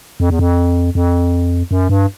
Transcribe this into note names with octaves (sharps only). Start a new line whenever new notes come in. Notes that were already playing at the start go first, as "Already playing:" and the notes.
F2
E2
F2
F2
F#2
G2